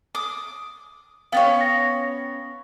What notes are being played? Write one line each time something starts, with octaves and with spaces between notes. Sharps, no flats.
D6 D#6
B3 C#4 C#5 F5 G5 A6
A#6